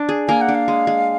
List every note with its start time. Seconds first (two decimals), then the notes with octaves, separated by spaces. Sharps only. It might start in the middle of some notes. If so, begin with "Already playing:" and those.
Already playing: D4
0.09 G#4
0.28 A#3 G#5
0.41 F#5
0.48 D4
0.55 F5
0.68 G#3
0.87 G#3